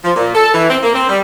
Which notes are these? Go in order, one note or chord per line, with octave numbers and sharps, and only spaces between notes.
F3
A#2
A4
E3
C4
A#3
C4
G3